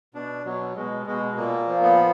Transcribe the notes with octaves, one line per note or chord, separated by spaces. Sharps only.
B2 D4
B2 F#3
B2 G#3
B2 G#3
A#2 A#3
F3
B3